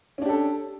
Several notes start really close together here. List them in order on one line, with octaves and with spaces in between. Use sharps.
C#4 D4 G4 A4